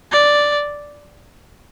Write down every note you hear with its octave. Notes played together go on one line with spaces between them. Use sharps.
D5